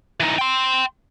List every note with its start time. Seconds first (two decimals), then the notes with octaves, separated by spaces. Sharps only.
0.20 E3 D#4
0.38 G5 C6